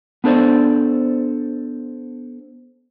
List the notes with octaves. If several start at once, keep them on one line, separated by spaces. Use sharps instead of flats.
B3 D4 A4 C5 D5